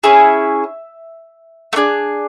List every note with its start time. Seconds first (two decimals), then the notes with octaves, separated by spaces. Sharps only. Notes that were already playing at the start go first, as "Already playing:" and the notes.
0.04 C#4 E4 G#4 E5
1.73 A3
1.76 D4 G#4